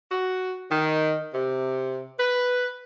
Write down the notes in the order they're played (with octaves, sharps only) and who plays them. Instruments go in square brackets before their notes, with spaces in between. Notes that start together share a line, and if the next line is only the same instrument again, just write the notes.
[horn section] F#4
D#3
C3
B4